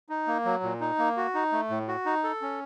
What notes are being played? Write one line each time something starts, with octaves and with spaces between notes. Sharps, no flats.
D#4
A#3
F#3
A#2
D#4
A#3
F#4
D#4
A3
A2
F#4
D#4
A4
C#4